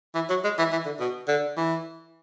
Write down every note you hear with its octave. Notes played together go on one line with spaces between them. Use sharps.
E3
F#3
G#3
E3
E3
D3
B2
D3
E3